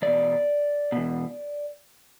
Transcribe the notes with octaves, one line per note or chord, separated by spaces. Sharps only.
E2 B2 D5
E2 B2